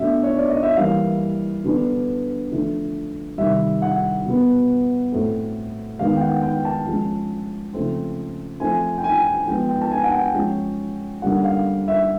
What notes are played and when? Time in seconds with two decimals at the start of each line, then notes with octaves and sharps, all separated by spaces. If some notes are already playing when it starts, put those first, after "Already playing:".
Already playing: B2 F#3 A3 D4 E5
0.23 C#5
0.37 D5
0.49 D#5
0.63 E5
0.76 E3 G3 A#3 F5
1.63 D3 F#3 B3 D4
2.51 D3 F3 A3
3.38 C3 D#3 G3 E5
3.82 F#5
4.25 B2 F#3 B3
5.12 A2 F#3 A3 C4
5.99 D#3 G#3 B3 F5
6.16 G5
6.21 F#5
6.42 G5
6.65 A5
6.86 F3 G#3 C#4
7.73 C#3 F3 A3 C4
8.60 F3 A3 C4 G#5
8.98 G5
9.04 G#5
9.47 F3 G#3 B3 G5
9.69 G5
9.81 A5
9.91 G#5
10.04 F#5
10.12 G5
10.35 F3 G#3 C#4
11.22 D3 G3 A#3 C#4 F#5
11.44 F5
11.88 E5